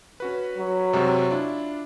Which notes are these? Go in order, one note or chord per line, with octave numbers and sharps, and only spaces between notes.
C#4 F#4 B4
F#3
F#2 C3 G#3
D4 E4 F4